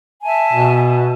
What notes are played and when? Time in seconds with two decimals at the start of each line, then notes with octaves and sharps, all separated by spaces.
0.23 E5 G#5 A5
0.53 B2